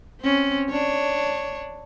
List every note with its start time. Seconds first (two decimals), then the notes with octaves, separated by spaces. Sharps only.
0.21 C4 C#4
0.69 D4 C#5